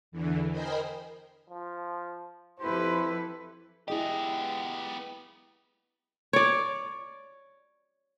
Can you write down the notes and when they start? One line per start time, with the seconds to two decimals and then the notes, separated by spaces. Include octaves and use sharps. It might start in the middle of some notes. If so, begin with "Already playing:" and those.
0.11 E2 D3 E3
0.51 A#4 C5 D#5 G5 G#5 B5
1.50 F3
2.60 F2 E4 G4 A4 B4 C5
3.88 B3 E4 G4 G#4 D#5
6.33 C#5 D5